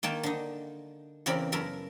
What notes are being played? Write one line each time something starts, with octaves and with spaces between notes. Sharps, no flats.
D#3 A#3 G5 A5
D3 D#4
E2 C#3 C4 A#4 D5 B5
F#2 A4 A#4 B5